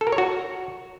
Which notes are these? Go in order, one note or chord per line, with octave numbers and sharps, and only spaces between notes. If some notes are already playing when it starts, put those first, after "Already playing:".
A4
A#4
C#5
F#4